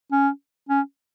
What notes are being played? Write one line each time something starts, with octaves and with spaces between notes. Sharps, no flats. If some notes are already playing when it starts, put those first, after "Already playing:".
C#4
C#4